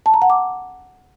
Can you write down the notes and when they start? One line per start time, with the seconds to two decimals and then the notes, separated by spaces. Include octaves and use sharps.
0.06 A5
0.14 A#5
0.22 F#5
0.30 D6